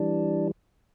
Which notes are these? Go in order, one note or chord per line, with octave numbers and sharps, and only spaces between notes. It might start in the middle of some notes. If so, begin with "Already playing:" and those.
Already playing: E3 G3 D4